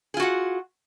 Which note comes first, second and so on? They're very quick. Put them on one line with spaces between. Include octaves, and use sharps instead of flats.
G#4 F4 F#4 F#5